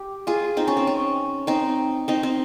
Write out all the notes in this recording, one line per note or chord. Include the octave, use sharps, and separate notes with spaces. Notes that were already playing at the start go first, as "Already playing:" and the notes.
Already playing: G4
F4 G#4
C4 D#4
C#4
C4
C#4
C4 D#4
C4 D#4
C4